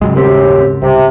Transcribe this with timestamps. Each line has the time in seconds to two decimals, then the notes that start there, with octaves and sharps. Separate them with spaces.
0.01 G#2 C#3 F#3 G#3
0.15 D#1 F#2 C4 G4
0.82 C2 C3